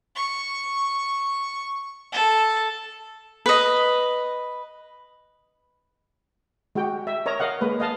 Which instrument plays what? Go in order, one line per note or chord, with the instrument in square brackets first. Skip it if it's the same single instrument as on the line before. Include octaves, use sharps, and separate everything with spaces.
[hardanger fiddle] C#6
A4
[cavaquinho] B4 D#5
[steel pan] G#3 F#4 G4 G5
E5
A#4 C#5 D#5 A#5
A#4 D#5 F5 F#5
G#3 A#3 B4
D#5 F5 A5